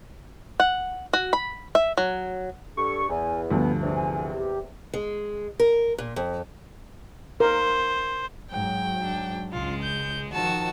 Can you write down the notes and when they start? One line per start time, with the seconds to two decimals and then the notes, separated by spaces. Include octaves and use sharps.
0.60 F#5
1.13 F#4
1.33 B5
1.75 E5
1.97 F#3
2.77 G2 A4 C#6
3.09 E2 G#5
3.50 D2 G2 F3 B3
3.82 E2 C3 D4
3.95 G#5
4.33 G4
4.94 G#3
5.60 A#4
5.98 A#2
6.16 F2
7.40 A#4 C5
8.51 G#2 F#3 G5
9.02 D4
9.53 C#2 G#3 F4
9.82 G6
10.33 D#3 F3 F#4 A5 E6